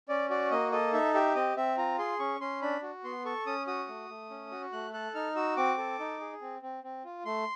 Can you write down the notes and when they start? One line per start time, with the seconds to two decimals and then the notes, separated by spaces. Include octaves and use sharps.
0.09 C#4 D5
0.30 F#4 D5
0.51 A#3 D#5
0.72 A4 D#5
0.93 D#4 E5
1.14 G4 E5
1.35 C4 D#5
1.56 C4 E5
1.77 F4 A#5
1.99 G#4 C6
2.19 C#4 C#6
2.41 C#4 C6
2.62 D4 B5
2.83 F#4
3.04 B3 C6
3.25 A4 C#6
3.46 C#4 D#6
3.67 F#4 D#6
3.88 A3
4.09 A3
4.30 C#4
4.51 F#4
4.72 A3 F#6
4.93 A4 F#6
5.15 D#4 F6
5.36 F#4 E6
5.57 C4 D6
5.78 A4
5.99 D#4
6.20 G#4
6.41 C4
6.62 C4
6.84 C4
7.04 F4
7.25 A3 C6